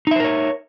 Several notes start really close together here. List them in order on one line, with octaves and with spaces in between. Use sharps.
D#4 E5 C5 A#4 C#5